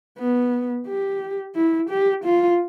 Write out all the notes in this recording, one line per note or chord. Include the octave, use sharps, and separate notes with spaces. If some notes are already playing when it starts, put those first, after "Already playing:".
B3
G4
E4
G4
F4